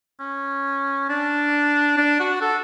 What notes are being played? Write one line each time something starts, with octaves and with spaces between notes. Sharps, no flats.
C#4
D4
D4
F#4
A4